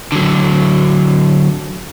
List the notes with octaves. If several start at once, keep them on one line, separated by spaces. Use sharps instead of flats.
D3 F#3